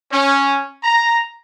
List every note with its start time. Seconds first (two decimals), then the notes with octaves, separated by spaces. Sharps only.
0.12 C#4
0.84 A#5